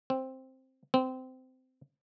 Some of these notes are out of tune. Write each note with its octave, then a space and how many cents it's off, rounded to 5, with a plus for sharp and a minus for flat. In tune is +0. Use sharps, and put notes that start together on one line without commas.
C4 +5
C4 -20